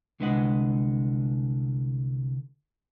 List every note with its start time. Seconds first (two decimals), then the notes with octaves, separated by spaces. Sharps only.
0.20 C2 D3 G#3 B4 D#5 F#5